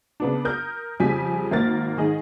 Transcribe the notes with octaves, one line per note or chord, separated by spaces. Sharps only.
C#3 B3 D4
A#4 D#6 G6
F2 C#3 G3 G#5 B6
G#1 A#3 A#4 A6
G#2 D#3 D#4 G#4 D#5